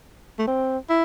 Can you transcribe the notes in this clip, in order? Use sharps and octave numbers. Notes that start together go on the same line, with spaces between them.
A3
C4
E4